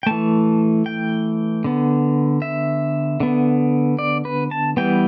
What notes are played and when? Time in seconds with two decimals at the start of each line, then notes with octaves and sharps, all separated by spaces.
0.03 G5
0.06 E3 A3 A5
0.86 G5
1.64 D3 B3
2.42 E5
3.20 D3 B3
3.99 D5
4.25 B4
4.51 A5
4.77 E3 G3 B3 G5